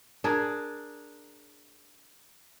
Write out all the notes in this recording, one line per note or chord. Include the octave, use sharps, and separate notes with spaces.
D4 G#4 A#4